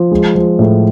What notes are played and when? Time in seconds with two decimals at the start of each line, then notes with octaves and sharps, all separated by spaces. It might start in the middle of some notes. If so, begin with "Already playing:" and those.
Already playing: F3
0.11 G#3
0.35 F3
0.59 A2